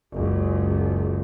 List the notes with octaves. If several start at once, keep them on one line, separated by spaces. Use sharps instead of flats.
F#1 C#2